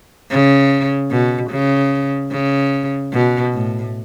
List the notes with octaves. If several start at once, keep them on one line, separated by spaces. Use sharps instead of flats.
C#3
B2
C#3
C#3
B2
A2